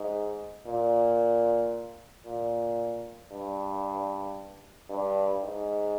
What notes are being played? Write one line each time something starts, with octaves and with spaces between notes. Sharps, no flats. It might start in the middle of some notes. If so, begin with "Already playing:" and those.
Already playing: G#2
A#2
A#2
G2
G2
G#2